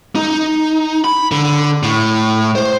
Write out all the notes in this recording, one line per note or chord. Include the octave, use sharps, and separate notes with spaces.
D#4
B5
D3
A2
C5